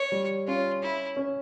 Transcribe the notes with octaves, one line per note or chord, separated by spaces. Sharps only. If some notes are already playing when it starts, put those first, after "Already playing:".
Already playing: C#5
G3
C#4 F4
E4
C#4